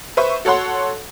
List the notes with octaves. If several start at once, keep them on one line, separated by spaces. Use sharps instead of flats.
B4 C5 E5 C#6
F#4 A4 C#5 F#5 C6